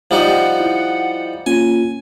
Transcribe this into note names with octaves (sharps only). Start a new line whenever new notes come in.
F3 G3 D#4 F#5
E4
A#3 C#4 F4 G#5